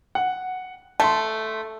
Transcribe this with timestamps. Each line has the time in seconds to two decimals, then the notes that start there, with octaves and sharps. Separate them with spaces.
0.15 F#5
1.00 A3 A5 C6